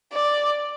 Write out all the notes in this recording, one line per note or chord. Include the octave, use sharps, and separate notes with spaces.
D5